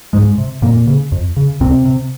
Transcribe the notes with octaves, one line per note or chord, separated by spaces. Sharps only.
C2 G#2 G#3
C3
F2 A#2 A#3
C#3
F2
C#3
C#2 C3 C4
C3